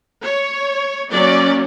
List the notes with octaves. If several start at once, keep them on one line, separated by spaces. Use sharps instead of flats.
C#5
F#3 A#3 C#4 D5